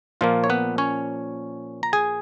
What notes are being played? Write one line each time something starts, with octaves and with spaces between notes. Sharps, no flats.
A#2 F3 A#3 F4
C#5
B3 B4
C#4 C#5
A#5
G#4 G#5